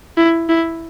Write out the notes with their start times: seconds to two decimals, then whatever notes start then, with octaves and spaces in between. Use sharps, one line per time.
0.17 E4
0.49 E4